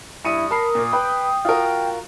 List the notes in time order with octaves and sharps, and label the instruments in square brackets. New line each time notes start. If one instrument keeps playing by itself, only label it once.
[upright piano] G2 C#7 D#7 [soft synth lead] E4 [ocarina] D#6
[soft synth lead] A#4 [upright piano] A5 B5 C7
[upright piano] A#2
[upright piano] B4 B5 [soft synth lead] G5
[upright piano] F4 F#4 A#4